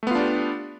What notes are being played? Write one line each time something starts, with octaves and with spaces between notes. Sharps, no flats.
A3 B3 D4 F4 G4